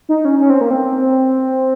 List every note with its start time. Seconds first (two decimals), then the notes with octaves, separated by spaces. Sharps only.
0.09 D#4
0.25 C#4
0.40 C#4
0.50 C4
0.61 A#3
0.70 C4